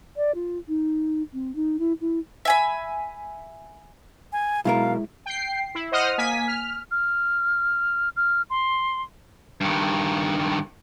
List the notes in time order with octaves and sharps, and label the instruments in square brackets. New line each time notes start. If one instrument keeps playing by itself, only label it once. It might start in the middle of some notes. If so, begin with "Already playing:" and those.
[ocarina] D5
F4
D#4
C4
D#4
E4
E4
[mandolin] E5 G#5 B5
[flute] G#5
[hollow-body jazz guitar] B1 B2 A#4 [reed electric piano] G#3 E4 [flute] F5
[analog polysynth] G5 C7
E4
C5 D#5 F#5 D#6 F6
A#3 G#5 B6
F6
[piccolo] F6
F6
C6
[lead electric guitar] G2 D#3